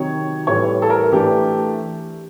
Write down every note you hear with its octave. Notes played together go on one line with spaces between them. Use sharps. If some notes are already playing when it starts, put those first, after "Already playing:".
Already playing: C3 D#3 F#3 C#5
A2 E3 G3 C#5
A4
A#4
E3 A3 D4 G4